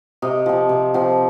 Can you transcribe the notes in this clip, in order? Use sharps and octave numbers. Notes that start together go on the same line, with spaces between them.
C3 D#5
F3 C4
C3
F3 C4